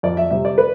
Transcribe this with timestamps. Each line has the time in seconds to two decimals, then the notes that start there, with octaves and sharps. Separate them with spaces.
0.03 F2 D5
0.17 E5
0.31 C3 G3 E5
0.45 D5
0.58 B4